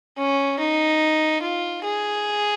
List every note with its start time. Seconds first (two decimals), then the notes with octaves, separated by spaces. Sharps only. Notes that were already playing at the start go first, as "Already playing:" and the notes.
0.18 C#4
0.60 D#4
1.42 F4
1.84 G#4